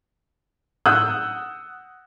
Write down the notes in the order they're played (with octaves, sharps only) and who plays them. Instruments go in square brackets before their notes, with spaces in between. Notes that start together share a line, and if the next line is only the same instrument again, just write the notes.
[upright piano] F#5 D#6 E6 F#6 G6